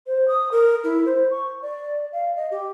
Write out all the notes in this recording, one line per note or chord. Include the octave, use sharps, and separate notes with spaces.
C5
D#6
A#4
E4
C5
C#6
D5
F5
D#5
G4